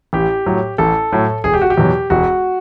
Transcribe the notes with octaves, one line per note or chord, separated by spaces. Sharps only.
A1 G4
A2 F#3
A1 A4
A2 F#3
E1 G#4
G4
F#4
G4
E2 B2 F#3
E1 F#4